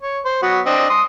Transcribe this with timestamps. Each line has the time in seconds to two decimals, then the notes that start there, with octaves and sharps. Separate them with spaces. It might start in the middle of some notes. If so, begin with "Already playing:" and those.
0.02 C#5
0.25 C5
0.43 F#3 B3 F#4
0.66 C4 D4 D#5
0.90 C6 D#6